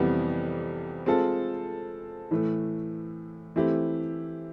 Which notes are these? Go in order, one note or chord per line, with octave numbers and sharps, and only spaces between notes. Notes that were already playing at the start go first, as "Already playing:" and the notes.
Already playing: F2 C3 E3 G3 B3
G#3 C4 F4 A4
A2 E3 A3
E3 A3 C4 E4 G4